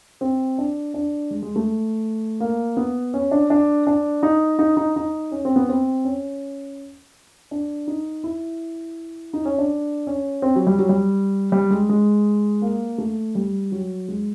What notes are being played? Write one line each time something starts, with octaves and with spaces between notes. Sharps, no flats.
C4
D4
D4
G#3
G#3
A3
A#3
B3
C#4
D4
D4
D4
D#4
D#4
D#4
D#4
C#4
C4
B3
C4
C#4
D4
D#4
E4
D#4
C#4
D4
C#4
C4
F#3
G3
F#3
G3
G3
G#3
G#3
A#3
A3
G3
F#3
G#3